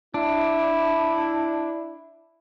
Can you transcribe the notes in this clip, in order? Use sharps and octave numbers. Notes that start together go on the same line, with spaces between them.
D4 E4